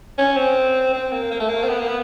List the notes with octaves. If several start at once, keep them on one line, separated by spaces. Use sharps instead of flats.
C#4
C4
C4
A#3
A#3
A3
A#3
C4
B3
A#3
B3